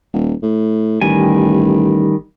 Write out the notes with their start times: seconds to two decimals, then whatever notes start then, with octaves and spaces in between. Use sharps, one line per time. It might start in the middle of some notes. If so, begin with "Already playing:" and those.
0.13 D#1
0.42 A2
1.01 A1 D#3 G3 G#5